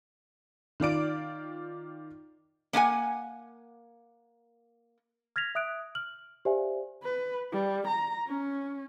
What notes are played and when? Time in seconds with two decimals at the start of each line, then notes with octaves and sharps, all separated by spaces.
0.80 D#3 F4 D5 D7
2.73 A#3 D4 F#5 G#5
5.36 F6 G#6 A#6 B6 F7
5.55 E5 D#6 F#6 D7
5.95 F6 F#7
6.45 G4 C5 D5 E5 F5 G#5
7.04 B4
7.52 G3
7.88 A#5
8.28 C#4